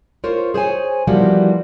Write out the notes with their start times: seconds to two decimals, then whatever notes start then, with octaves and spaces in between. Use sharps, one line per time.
0.24 F4 A#4 C5 C#5
0.54 G#4 C5 C#5 G#5
1.07 E3 F3 G3 A#3 B3 F#4